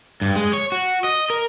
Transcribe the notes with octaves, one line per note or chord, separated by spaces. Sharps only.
G2
G#3
C#5
F#4
D#5
A#4